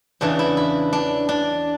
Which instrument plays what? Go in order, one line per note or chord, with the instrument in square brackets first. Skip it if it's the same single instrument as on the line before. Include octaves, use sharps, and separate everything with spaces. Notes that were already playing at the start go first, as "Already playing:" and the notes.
[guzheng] E2 C#3 E3 D4
E4
E4
D4
D4